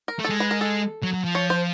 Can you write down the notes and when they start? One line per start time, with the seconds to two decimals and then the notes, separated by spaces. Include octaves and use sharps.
0.08 A#4
0.20 A3
0.24 A4
0.30 G#3
0.40 B4
0.51 A#4
0.61 A4
1.03 F#3
1.14 F#3
1.24 F3
1.35 C#5
1.50 C5